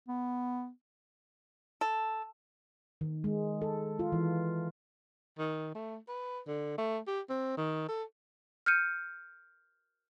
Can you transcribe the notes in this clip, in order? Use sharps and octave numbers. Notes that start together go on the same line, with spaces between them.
B3
A4
D#3
G#3
A4
F4
E3
D#3
A3
B4
D3
A3
G4
C4
D#3
A4
F6 G6 C#7 D#7